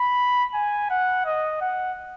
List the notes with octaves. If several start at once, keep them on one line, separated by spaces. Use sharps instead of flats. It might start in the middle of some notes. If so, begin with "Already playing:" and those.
Already playing: B5
G#5
F#5
D#5
F#5